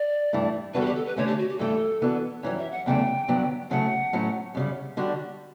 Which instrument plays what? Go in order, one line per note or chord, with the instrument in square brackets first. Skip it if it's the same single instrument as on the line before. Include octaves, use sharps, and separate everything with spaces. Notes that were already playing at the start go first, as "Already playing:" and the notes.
Already playing: [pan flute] D5
[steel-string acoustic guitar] G2 E3 A3 E4
[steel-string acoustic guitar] E2 D3 G3 D4 F#4 [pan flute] B4
[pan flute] A4
G4
A4
B4
[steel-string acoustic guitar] D3 A3 C#4 [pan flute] C#5
[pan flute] G4
F#4
G4
[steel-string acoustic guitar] G2 E3 A3 [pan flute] A4
[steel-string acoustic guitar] E3 B3 D4 F#4
[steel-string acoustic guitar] F#2 E3 G3 [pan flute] C#5
[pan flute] E5
F#5
[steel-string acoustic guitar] E2 C#3 F#3 A3 D4 [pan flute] G5
[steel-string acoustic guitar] G2 D3 F#3 B3 D4
[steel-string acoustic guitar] C#3 F#3 A3 E4 [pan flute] F#5
[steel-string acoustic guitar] A2 F#3 A3 C#4
F#2 C#3 G3
D3 G3 D4 F#4